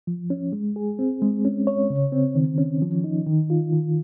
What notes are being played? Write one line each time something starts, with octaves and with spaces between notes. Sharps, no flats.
F3
C#4
G#3
G#4
C4
G#3
C#4
C#5
C#3
C4
D#3
C#4
F3
D#4
D#3
F4
D#3